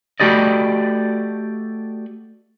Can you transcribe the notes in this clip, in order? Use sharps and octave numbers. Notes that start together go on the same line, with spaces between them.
A3 F#4 G4 D5 D#5